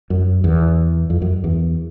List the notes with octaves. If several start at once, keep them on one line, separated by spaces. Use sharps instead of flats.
F#2
E2
F2
F#2
E2